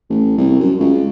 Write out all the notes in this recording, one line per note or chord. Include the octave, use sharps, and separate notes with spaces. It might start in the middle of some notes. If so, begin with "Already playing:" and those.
A1
C2
F#2
C#2